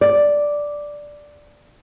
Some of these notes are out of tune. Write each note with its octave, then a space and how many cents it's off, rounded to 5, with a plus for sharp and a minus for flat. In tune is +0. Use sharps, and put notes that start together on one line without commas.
D5 +0